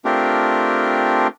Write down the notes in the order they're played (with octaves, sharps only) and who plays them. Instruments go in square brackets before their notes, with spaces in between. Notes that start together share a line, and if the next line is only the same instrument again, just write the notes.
[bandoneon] A3 C4 D4 F4 G4 A#4